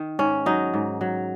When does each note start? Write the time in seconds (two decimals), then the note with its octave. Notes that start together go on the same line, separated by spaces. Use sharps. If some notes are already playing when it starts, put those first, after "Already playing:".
Already playing: D#3
0.19 G#2 C#4
0.46 F#3 D#4
0.74 G#2
1.01 F#3